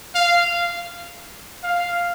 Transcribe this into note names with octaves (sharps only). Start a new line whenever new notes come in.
F5
F5